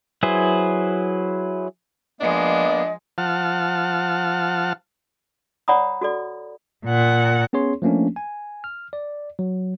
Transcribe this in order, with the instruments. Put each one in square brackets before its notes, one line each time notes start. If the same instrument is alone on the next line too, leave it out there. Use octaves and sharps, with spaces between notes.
[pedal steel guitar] F#3 E4 G#4 B4 C5
[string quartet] F3 G#3 [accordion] A#3 B3 [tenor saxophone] D4 [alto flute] D#5
[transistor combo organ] F3 F#5 A5 F6
[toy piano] C#5 D5 F#5 A#5 B5 D#6
F#4 A4 D5
[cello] A#2 F#5
[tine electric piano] B3 C#4 G#4 C#5 C6
F3 A3 A#3 C#4 D4
G#5
F6
D5
F#3